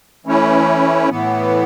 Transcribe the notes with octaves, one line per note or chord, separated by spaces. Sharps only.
E3 A3 C#4 E4
A2 E3 B3